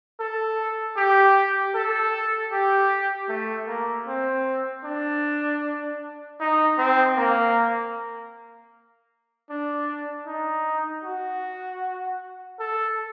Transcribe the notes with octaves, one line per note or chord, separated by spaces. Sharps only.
A4
G4
A4
G4
A3
A#3
C4
D4
D#4
C4
A#3
D4
D#4
F#4
A4